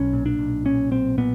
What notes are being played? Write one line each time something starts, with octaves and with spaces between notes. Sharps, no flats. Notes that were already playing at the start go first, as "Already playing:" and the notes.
Already playing: B1 C#4
A#2
D4
B1
A#2 C#4
B1 C4
A#2 B3